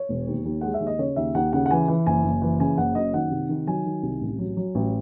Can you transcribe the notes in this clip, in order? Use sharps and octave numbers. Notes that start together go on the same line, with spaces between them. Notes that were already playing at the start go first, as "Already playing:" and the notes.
Already playing: C#5
E1
D#2
D#2
G#3 F#5
E5
D#2
D#5
C#3 C#5
D#2 E5
D#2 F#5
C#3 F#5
F#5
E3 G#5
E3
F#1 G#5
F#1
E3
C#3 G#5
F#1 F#5
F#2 D#5
D#3 F#5
C3
D#3
F#3 G#5
D#3
C2
A1
F#3
F#3
A1